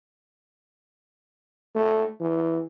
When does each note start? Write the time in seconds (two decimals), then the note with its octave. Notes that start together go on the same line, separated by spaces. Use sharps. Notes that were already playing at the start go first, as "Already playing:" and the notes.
1.75 A3
2.21 E3